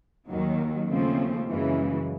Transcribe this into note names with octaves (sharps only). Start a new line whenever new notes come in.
D#2 D#3 F#3
D#2 C#3 F3 A3 C4
F#2 C#3 E3 G#3